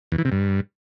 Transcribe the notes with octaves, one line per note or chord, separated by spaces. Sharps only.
E2
E3
C3
G2